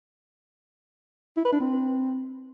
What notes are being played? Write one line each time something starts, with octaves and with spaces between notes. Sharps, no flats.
E4
B4
D4
C4